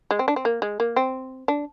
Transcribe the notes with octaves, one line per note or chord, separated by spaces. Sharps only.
G#3
C4
D4
C4
A#3
G#3
A#3
C4
D4